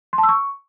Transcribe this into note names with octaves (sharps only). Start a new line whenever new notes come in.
C6
A5
E6
C#6